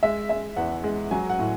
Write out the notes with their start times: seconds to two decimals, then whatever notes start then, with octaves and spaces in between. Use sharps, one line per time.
0.03 G#3 E5
0.29 G#3 E5
0.57 E2 F#5
0.84 G#3
1.11 F#3 G#5
1.30 F#5
1.39 A2